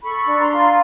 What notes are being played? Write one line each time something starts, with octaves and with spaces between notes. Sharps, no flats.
A4 B5 C#6
D4
A#5 C6
F4